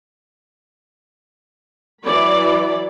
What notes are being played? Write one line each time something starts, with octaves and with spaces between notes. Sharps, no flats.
E3 F#3 D5 B5